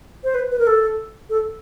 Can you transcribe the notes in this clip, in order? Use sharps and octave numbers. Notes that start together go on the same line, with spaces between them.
C5
B4
B4
A#4
A4
A4